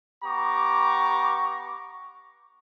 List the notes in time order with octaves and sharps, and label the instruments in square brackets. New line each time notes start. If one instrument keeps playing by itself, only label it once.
[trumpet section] B3 G4 A#5 C#6 D6